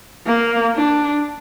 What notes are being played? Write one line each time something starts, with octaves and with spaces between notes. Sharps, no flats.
A#3
D4